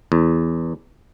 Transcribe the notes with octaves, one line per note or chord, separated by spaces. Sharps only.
E2